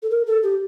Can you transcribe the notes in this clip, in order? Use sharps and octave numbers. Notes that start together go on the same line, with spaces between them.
A4
A#4
A4
G4